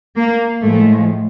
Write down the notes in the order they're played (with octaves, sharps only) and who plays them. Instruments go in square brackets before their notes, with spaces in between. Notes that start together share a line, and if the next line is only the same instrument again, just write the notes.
[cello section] A#3
A2 F3 G#3 A3